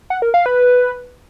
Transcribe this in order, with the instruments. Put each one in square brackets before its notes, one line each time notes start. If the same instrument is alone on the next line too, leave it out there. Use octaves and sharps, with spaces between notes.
[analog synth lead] F#5
A#4
F5
B4